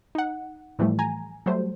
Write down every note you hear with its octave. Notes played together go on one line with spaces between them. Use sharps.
D#4 F#5
A2 E3 F3 G3 A3
G#5 A#5
F#3 G3 A3 C5